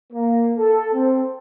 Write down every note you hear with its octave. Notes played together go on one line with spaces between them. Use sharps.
A#3
A4
C4